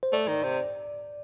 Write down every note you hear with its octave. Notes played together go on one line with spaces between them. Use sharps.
C5
A3 D5
D#3
C3